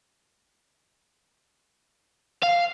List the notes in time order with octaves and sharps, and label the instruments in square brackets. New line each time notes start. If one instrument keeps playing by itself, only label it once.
[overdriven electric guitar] F5